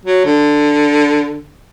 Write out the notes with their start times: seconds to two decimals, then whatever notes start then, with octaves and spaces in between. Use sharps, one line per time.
0.05 F#3
0.25 D3